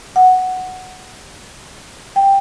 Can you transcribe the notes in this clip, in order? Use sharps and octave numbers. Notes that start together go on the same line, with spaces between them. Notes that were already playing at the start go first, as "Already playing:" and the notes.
F#5
G5